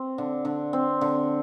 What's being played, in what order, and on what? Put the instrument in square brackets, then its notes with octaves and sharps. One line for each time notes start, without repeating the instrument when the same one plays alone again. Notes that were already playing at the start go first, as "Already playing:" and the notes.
Already playing: [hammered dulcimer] C4
D3
D3
C4
D3